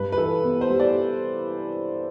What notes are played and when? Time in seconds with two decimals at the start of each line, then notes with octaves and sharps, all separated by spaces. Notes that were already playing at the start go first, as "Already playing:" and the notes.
Already playing: G2 B4
0.12 B4
0.18 E3 A4
0.44 B3
0.61 C5
0.70 G3
0.80 D5